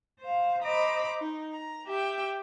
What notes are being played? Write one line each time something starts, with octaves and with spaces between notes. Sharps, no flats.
C5 F5
C5 D#5 A#5 B5 D6
D#4
A#5
G4 E5 G5